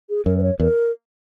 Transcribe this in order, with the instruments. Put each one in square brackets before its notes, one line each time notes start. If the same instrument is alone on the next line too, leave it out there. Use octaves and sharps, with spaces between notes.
[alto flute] G#4
[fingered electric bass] F#2 [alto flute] A#4
[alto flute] B4
C#5
[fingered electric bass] E2 [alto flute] A#4